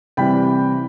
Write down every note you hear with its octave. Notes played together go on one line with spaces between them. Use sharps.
C3 E3 G3 G5 B5